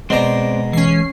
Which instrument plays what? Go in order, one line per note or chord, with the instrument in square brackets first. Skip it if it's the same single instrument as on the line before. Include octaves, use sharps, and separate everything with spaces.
[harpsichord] B2 A#5 [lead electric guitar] G#3 [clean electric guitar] C4 C5 D5
[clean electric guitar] E3 [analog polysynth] C#4 C7